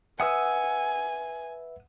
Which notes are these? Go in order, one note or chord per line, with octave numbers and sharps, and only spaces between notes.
B4 E5 F#5 G#5 D#6 E6